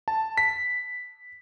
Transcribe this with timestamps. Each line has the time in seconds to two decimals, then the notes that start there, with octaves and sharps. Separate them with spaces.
0.08 A5
0.37 B6